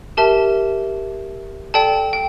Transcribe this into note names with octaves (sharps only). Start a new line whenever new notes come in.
G4 A#4 E5 A5
A4 D5 G5 A5
G5